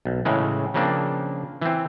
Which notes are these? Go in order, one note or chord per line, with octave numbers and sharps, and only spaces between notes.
B1
A2 C#3 E3 G#3
C#3 F3 A#3 C4 D4
E3 C4